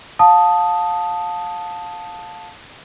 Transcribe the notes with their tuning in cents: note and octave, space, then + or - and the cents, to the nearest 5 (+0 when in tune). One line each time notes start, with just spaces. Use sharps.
F5 +25 A5 +0 D#6 +0